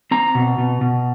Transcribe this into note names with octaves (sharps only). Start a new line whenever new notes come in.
C4 A#5
B2
B2
B2